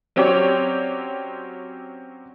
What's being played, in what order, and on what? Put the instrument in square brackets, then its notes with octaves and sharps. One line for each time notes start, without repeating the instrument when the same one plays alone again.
[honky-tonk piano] F#3 C4 C#4 G4 C#5 D5